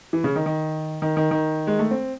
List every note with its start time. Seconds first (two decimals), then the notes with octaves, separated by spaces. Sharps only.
0.13 E3
0.24 C#3
0.36 D#3
0.46 D#3
1.02 D#3
1.17 D#3
1.31 D#3
1.67 G#3
1.79 A3
1.91 C4